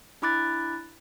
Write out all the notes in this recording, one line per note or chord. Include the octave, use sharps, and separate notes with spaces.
D4 E4 B5 D6 F#6 A6